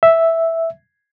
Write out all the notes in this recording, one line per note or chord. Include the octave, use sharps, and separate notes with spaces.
E5